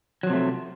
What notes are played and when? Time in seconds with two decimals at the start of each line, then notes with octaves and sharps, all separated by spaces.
0.23 F#3
0.27 F3
0.30 C3
0.33 A3